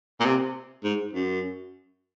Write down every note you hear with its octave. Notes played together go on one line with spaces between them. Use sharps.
A#2
C3
G#2
F#2